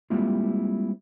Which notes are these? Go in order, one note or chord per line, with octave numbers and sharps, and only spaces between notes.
G3 G#3 A#3 C4 E4 F4